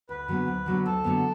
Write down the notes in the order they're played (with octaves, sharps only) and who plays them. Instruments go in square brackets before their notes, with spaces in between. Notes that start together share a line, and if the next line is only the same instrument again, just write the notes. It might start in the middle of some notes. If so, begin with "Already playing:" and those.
[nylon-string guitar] D2 [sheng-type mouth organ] B4
[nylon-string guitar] D3 F#3 B3
D2
D3 F#3 B3
[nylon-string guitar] D2 [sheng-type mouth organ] A4
[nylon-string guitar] D3 F#3 B3